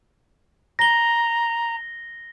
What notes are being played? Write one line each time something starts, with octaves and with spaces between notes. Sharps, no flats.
A#5 A#6 G7